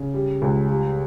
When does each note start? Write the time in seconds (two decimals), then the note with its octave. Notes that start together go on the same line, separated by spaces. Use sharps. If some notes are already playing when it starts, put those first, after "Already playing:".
Already playing: C#3
0.14 G3
0.42 C#2
0.69 G3